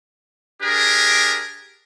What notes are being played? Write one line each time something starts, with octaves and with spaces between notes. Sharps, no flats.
D4 G4 G#4 A#4